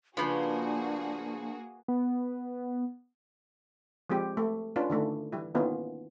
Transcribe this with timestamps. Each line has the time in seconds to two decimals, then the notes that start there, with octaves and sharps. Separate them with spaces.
0.17 C#3 F3 A#3 D4 F#4 G#4 B4
1.88 B3
4.10 F3 G#3 C4 G4
4.37 A3
4.76 C#4 D4 F4 B4
4.90 D3 D#3 A3 D4
5.32 E3 G3 E4
5.55 D#3 A#3 B3 C#4 E4 F4